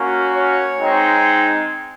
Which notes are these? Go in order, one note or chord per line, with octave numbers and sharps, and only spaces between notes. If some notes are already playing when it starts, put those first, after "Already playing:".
Already playing: A#3 C#4 F#4
C#5
G#3 C4 D#4